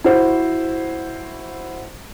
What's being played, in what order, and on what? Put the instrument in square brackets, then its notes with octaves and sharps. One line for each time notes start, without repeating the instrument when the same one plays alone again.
[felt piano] E4 F#4 C5